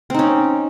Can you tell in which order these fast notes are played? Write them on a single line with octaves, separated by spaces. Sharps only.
C4 D#4 C#4